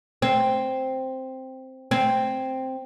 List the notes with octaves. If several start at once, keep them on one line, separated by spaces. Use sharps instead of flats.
C4
C4